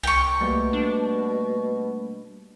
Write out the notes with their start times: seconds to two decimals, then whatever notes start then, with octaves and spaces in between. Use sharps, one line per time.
0.03 C2 G5 C#6
0.41 B2 G3 A3 A#3
0.73 D4